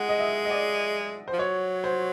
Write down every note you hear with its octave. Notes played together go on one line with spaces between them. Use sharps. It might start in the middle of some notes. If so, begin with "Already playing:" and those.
Already playing: G#3 F#5
D#5
E5
D#5
D5
F3 C5
F#3 C#5
C5